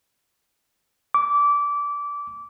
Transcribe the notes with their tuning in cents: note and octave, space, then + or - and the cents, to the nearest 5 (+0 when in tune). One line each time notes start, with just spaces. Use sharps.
D6 -20